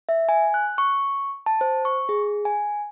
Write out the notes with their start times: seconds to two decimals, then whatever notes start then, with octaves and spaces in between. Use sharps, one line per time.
0.09 E5
0.29 G#5
0.54 F#6
0.78 C#6
1.46 A5
1.61 C5
1.85 C#6
2.09 G#4
2.45 G#5